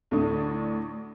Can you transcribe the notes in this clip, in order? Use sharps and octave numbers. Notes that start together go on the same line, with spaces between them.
D2 A2 D3 A3 D4 D#6